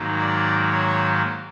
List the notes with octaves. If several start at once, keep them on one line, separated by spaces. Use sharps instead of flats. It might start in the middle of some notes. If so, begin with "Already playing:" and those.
Already playing: G#2 D#3 F#3 A#3
D5
C#5